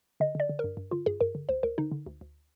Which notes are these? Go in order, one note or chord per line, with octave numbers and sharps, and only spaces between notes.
D3 D#5
D3 D5
D3
G2 A#4
G2
D3 F4
G2 G#4
G2 A#4
D3
D2 C5
D2 A#4
D3 D#4
D3
D2
D2